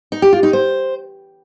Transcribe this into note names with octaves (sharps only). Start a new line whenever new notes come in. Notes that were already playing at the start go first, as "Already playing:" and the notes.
D#4
G4
F4
D#4
C5